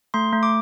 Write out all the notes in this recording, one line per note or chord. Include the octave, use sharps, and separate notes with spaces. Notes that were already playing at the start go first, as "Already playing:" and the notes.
A3 C6
A3
D6